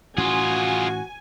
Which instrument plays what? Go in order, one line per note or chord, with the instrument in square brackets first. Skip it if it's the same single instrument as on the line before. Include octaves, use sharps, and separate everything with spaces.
[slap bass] A2 E3 C#4 [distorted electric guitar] F4 G#4 [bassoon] F#4 [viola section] G#5